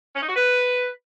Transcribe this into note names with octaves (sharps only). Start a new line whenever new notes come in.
C#4
D#4
F#4
B4